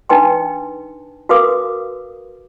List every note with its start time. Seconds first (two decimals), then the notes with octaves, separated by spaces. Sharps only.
0.09 D4 D#4 B4 G5 C6
1.29 F#4 A#4 B4 F5 D6 D#6